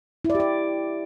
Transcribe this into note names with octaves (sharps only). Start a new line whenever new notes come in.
E4
D5
G4
D5